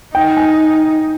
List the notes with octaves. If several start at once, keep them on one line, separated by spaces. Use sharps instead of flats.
D#4 G5
G#5